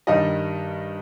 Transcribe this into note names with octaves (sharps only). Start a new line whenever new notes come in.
G2 D#3 G3 D#4 D#5